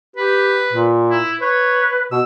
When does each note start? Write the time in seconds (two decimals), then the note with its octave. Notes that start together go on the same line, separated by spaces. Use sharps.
0.16 G4 B4
0.73 A#2
1.10 E4
1.41 B4 C#5
2.12 B2 E6